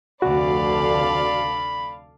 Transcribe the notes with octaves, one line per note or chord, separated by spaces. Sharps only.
F1 D2 D3 F#4 A4 D5 F5 B5